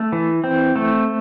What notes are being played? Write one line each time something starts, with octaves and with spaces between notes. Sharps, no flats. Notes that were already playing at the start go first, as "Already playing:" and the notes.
Already playing: A3
E3
C4
A3